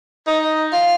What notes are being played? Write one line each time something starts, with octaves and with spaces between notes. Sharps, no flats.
D#4
F4